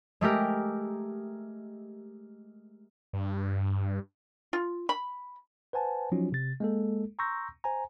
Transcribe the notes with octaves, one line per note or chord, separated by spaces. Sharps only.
G#3 A3 G4 A#4
G2
F4
B5
B4 C5 F#5 G#5 A5
F3 F#3 C#4 D#4 F4 F#4
C3 A6
G#3 A#3 A4
A#5 C6 C#6 E6 G6 A#6
C5 G#5 A#5